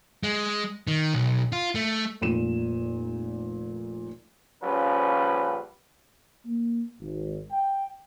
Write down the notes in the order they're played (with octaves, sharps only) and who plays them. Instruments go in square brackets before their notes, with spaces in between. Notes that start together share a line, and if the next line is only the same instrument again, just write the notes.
[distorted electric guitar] G#3
D#3
B1
F4
A3
[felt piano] F1 A#2 D#7 E7
[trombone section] A#1 C#3 F3 G3 C#4 B4
[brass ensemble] A#3
G#1
G5